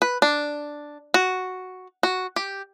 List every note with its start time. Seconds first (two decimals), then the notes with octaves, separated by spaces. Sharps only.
0.02 B4
0.22 D4
1.14 F#4
2.03 F#4
2.36 G4